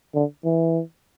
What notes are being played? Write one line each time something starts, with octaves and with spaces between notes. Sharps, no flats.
D3
E3